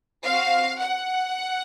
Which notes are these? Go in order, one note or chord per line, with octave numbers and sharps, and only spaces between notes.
C4 F#4 F5
F#5